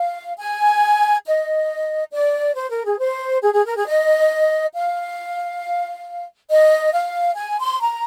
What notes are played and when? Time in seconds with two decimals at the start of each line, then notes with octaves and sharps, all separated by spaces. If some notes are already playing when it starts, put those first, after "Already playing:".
Already playing: F5
0.37 G#5
1.25 D#5
2.11 D5
2.55 C5
2.70 A#4
2.85 G#4
2.99 C5
3.42 G#4
3.53 G#4
3.64 A#4
3.75 G#4
3.86 D#5
4.74 F5
6.49 D#5
6.93 F5
7.36 G#5
7.58 C6
7.80 A#5